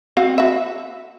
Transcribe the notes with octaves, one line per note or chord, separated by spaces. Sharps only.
C4 F#4 F5
F#4 E5